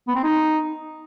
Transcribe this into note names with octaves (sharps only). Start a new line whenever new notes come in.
B3
C4
D#4